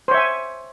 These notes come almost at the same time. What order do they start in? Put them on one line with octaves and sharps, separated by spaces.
C5 C#5 E5 G#5